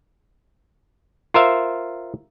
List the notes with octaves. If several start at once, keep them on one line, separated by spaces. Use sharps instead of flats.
F4 A#4 C5 E5 F5